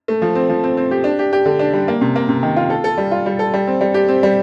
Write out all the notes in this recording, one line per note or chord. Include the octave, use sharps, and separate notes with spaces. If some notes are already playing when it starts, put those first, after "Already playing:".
A3
F3
C4
F3
C4
C4
G4
D4
G4
G4
D3
D4
G3
A#3
C3
A#3
C3
D#3
F4
A4
A4
G3
F4
G3
A4
G3
C4
G3
G4
C4
G3